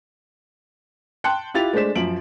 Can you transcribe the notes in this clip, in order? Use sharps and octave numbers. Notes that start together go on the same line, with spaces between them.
G5 A5 C6 F#6 C#7
E4 F4 G4 A6 F7
G#3 A3 D4 C5 B6 E7
F#2 F3 D7 F#7